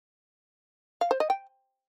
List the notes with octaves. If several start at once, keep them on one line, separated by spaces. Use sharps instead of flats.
F5
C5
D#5
G5